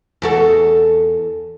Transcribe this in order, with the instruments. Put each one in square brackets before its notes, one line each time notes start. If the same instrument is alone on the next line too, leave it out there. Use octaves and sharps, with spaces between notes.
[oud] E2 F#4 A4